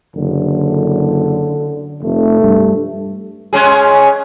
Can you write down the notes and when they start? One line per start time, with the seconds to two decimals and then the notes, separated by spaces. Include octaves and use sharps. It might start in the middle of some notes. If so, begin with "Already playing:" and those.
0.16 F#1 D3
2.03 F1 A3
2.42 G2
3.53 G#3 C#4 G#4